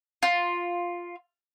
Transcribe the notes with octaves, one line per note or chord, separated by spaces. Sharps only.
F4